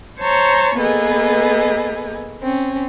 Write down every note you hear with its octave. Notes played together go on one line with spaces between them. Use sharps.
C5 C#5 A5 A#5 C6 C#6
A#3 B3 G#4 A4 B4 D#5
C4 C#4